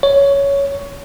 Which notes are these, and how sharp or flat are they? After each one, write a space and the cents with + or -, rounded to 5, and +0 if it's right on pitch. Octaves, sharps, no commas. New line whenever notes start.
C#5 +10